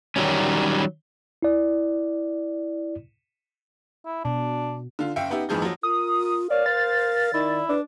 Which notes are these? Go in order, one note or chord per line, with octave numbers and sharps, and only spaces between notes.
D#3 F#3 G3 C#4
E4 D5
E4
B2 D4
D3 F4
F#1 E5 F5 G5 C#7
B3 D#4 G4 E5
F2 G#2 E3 F3 G#4 G6
F3 F#3
F4 A#4 D#6
A#4 C#5 D5 F5
C5 A6
D#3 E4 D5
D4 B4